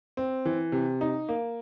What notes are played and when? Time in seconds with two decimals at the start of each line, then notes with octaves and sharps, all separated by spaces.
0.17 C4
0.45 E3
0.72 C3
1.01 D#4
1.29 A#3